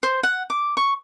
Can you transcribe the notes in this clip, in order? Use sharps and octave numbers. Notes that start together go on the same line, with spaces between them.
C5
F#5
D6
C#6